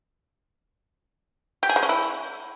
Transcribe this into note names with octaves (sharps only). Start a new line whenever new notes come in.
G4
G#4
G#3
C#4
E4